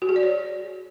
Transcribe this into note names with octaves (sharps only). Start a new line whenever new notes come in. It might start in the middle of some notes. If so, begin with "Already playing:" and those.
F#4
G#4
D5
C#5